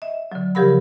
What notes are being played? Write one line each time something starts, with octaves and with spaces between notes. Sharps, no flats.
D#5 E5
D3 F#3
C#3 F3 G4 A#4 F#5 B5